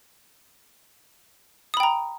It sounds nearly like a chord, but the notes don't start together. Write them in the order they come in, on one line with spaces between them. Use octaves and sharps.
D#6 B5 G5 A#5